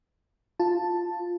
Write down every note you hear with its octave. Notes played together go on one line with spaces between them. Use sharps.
F4 A5